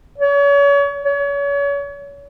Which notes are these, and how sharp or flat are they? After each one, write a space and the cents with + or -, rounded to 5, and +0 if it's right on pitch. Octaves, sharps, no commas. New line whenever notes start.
C#5 +35
C#5 +35